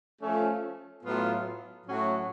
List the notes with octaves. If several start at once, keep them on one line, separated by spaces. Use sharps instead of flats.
F3 A3 C#4
A2 F#3 B3 F4
A2 F#3 C#4 F#4